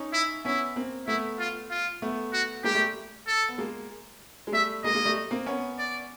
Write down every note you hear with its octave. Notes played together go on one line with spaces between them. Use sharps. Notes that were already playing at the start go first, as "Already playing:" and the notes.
Already playing: C#4 D#4
E4
B3 C#4 E4
A#3 C4
A3 B3 E4
F4
F4
A3 B3
F#4
G#3 A#3 G4
G3 A3
A4
B3
G#3 A#3
G#3
G3 A3 E5
G#3 A#3 D#5
G#3 A#3
G3 A3
A#3 C4
B3 C#4
D5